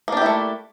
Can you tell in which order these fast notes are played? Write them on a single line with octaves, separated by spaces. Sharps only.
A#3 D4 G4 E4 A3